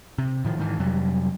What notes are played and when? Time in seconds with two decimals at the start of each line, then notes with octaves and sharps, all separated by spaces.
0.18 C3
0.45 A2 D#3 F3
0.58 G#2 D#3 E3
0.79 F2 C3 F#3 G3